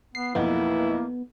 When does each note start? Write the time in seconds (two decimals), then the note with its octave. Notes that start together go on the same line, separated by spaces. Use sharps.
0.15 B3 C7
0.35 B1 F2 A#3 B3 E4